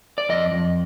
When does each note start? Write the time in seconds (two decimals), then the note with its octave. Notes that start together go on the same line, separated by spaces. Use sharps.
0.18 D5
0.29 F2 D#5
0.52 F2